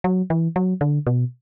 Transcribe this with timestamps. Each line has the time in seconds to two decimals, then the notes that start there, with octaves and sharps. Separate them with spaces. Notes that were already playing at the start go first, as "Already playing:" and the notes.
0.04 F#3
0.30 E3
0.56 F#3
0.81 D3
1.07 B2